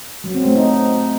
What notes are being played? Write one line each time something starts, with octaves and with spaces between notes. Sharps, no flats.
F#3
C4
A3
D#4